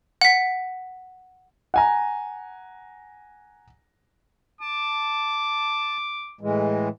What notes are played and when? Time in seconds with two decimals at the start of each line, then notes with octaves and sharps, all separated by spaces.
0.21 F#5 B6
1.74 F#5 G#5 A#5
4.61 A5 D6
6.41 A2 E3 G#3